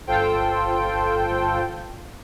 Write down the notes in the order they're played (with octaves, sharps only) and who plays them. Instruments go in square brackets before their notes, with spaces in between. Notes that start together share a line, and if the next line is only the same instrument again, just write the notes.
[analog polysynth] G1 F4 A4 C5 G5